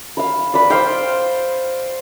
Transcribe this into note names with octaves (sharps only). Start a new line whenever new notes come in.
F5 B5
B4 D5
C5 D5 F5 G5